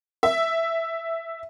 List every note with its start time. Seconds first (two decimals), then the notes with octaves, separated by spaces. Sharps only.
0.23 E5